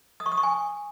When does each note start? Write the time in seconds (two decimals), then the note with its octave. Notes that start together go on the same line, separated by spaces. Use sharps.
0.20 D#6
0.26 C#6
0.32 D#6
0.38 C#6
0.43 G#5